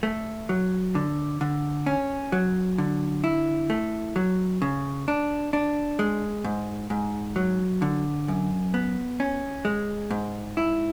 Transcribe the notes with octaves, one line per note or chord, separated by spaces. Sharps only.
A3
F#3
D3
D3
C#4
F#3
D3
E4
A3
F#3
C#3
D4
D4
G#3
G#2
G#2
F#3
D3
F#2
B3
C#4
G#3
G#2
E4